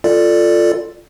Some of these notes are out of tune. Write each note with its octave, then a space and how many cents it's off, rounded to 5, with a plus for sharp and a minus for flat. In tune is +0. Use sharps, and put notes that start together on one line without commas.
F4 +0 A4 +10 D5 +10